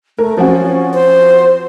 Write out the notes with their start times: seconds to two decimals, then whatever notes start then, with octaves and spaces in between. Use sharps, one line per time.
0.18 A3 A#4
0.38 F3 C4 C#4 F#4
0.94 C5